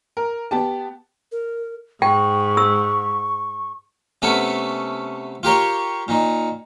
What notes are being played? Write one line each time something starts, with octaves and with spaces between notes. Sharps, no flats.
A#4
B3 G4 A5
A#4
G#2 G5 C#6
E6
C3 A3 B3 C#4 A4
F4 G4 A#4 C#5
A#2 D#3